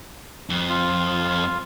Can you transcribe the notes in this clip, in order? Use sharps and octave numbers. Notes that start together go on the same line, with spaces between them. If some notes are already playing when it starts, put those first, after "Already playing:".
F2
F4